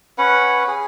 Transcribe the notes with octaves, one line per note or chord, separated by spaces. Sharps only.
C#4 B4 F#5
G#4